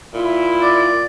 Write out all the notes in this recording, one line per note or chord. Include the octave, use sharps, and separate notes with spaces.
A#2 E4
D5